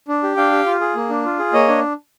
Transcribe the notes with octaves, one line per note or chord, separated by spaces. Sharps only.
D4
G4
D4 F5 G5
G4
F4
G#4
A#3
D4
F4
G#4
A#3 C#5 D#5
D4